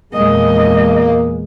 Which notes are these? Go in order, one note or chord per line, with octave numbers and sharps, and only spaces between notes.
E2 A#2 G#3 A#3 D#5